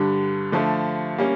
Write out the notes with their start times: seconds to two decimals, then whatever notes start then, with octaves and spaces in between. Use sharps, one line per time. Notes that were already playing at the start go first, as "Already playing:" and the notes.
Already playing: G2 D3 G3
0.52 D3 F3 A3
1.18 G3 A#3 C#4